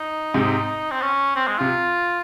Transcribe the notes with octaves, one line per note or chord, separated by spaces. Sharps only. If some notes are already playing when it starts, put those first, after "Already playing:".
Already playing: D#4
G#2 C3
C4
C#4
C4
G#3
C3 F4